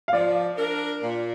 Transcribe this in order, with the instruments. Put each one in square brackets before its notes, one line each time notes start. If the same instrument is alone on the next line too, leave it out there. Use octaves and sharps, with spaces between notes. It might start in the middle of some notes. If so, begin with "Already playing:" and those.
[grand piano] F5
[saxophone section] F3 [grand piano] D5
[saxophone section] D4 A#4
A#2